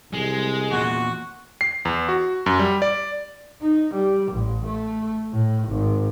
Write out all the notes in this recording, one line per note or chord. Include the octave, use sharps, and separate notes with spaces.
C2 G#3
E2 A#2 F#4
C7
E2
F#4
F#2
G3
D5
D#4
G3
A1
A3
A2
G#1